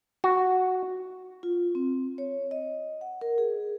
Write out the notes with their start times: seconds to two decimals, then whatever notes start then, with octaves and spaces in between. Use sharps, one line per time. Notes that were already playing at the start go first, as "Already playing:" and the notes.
0.24 F#4
1.43 F4
1.75 C4
2.18 C#5
2.51 D#5
3.01 F#5
3.21 A#4
3.38 G#4